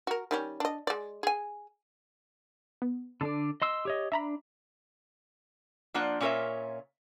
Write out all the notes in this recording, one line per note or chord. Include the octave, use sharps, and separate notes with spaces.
F#4 A#4
D#3 G3 C#4
D4 D#5
G#3 D5
G#4 G#5
B3
D3 D4 A4 D5
D#5 C6 E6
G4 C#5 D#5
D4 E5 A#5 B5
F3 A#3 D4 F4 F#5
A#2 C#4 F4 A#4 C#5 E5